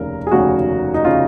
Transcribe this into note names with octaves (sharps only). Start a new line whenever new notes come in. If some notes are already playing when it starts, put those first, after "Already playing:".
Already playing: F1 D#2 C#3 A#4
G#4
F1 D#2 C#3 F#4
D#4
C#3 F4